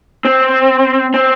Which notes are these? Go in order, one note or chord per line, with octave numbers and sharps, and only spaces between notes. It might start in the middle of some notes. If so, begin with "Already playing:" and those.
C4
C4